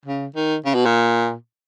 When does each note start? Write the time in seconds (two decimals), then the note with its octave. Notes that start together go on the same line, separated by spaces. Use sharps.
0.05 C#3
0.35 D#3
0.65 C#3
0.75 B2
0.85 A#2